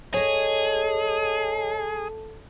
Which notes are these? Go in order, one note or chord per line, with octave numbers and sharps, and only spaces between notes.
G#4 A4 C#5 D#5